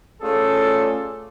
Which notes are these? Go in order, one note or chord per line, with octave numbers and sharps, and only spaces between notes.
A3 C#4 F4 G#4 A4 D5